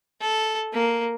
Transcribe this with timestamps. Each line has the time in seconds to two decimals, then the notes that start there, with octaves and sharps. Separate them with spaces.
0.21 A4
0.73 A#3